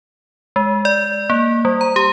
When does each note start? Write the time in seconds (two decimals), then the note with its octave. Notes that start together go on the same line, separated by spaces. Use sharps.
0.56 G#3
0.85 D5
1.30 A#3
1.65 G3
1.81 A#5
1.96 G4